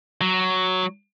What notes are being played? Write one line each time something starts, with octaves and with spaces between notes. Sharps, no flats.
F#3